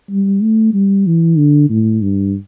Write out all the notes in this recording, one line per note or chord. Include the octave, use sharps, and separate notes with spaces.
G3
A3
G3
E3
D3
A2
G2